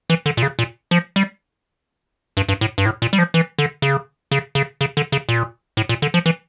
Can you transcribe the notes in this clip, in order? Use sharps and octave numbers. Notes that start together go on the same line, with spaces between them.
E3
D3
A#2
C#3
A#2
F3
G3
G2
G2
A2
G2
A2
A#2
G3
F3
E3
D3
C#3
C#3
C#3
C#3
D3
C#3
A#2
A2
A#2
D3
F3
E3